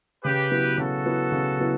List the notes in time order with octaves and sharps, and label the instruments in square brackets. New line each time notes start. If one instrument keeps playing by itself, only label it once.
[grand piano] C#3 [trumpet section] G4 B4
[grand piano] F#3 B3 E4
[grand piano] C#3 [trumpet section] F#4 A4
[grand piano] F#3 B3 E4
C#3
F#3 B3 E4